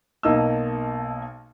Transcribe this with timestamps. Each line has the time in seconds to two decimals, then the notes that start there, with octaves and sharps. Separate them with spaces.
0.23 B1 A#3 D#4 D#5 A5 E6